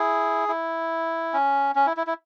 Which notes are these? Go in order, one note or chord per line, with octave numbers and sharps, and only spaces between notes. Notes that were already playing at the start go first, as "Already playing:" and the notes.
Already playing: E4 G#4
E4
C#4
C#4
E4
E4
E4